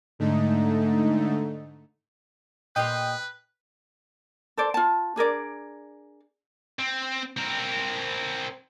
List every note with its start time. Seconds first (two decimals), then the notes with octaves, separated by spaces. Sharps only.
0.19 G#2 D3 A3 D#4
2.76 A#2 G4 B4 C5 D#5 G5
4.57 A4 C5 D5
4.74 F4 A5
5.16 D4 G#4 A#4 D5
6.79 C4
7.37 C4 A#4